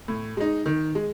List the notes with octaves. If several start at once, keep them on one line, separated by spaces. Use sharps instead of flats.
A2
G#3 D#4
D#3
G#3